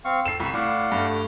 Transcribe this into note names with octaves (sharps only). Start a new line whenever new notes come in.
C4 F5 C#6
A4 C7 E7
C2 B5 C#6
A2 D5 F5 F#5
G2 A3